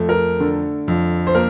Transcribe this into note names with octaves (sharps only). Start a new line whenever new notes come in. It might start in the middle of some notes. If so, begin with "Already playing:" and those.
Already playing: F2 A3
A#4
D3
F2
C5
A#3 A#4